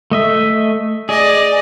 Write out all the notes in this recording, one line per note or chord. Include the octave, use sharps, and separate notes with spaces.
A3 D#5 E5
G#4 D5 D#5